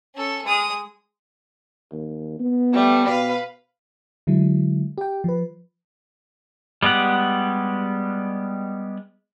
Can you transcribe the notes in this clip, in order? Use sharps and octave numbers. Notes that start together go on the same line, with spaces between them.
C#4 A4
G#3 D#6
D#2
B3
G3 A3
B2 B4 F5
D3 F#3 G#3 E4
G4 G5
F3 B4
G3 G#3 B3 G4 F#5